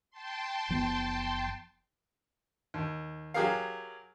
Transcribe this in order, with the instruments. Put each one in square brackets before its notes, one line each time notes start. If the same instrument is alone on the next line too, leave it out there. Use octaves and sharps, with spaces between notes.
[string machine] G5 A5 C6
[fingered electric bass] F#1 F3 B3
[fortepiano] D#2
F#3 G4 G#4 A#4 F5